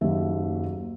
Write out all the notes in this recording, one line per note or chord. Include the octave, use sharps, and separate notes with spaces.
F#1 D#2 D#3 F#3 E5